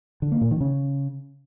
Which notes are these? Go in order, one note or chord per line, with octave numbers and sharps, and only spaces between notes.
D3
A#3
A#2
D#3
C#3